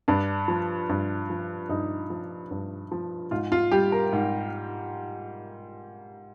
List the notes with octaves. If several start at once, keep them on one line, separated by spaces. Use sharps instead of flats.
G2 D4
F3
G2
F3
G2 D#4
F3
G2
F3
G#2 F4
F4
G3 G4
A#4
G#2